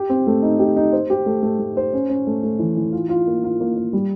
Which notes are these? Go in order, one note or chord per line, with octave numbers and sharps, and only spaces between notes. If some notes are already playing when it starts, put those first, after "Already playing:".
Already playing: G4
C4
A3
D#4
G4
D#4
C5
G4
A3
A3
A3
C5
C#4
C#4
A3
A3
E3
E3
F4
F4
A#3
F4
A#3
A#3
G3